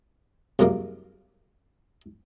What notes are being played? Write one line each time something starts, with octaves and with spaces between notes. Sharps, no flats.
C2 F#2 G#3 A#3 D5 F5